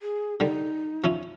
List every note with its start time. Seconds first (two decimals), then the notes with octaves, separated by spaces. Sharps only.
0.01 G#4
0.40 D3 G3 D#4
1.04 F3 C#4 E4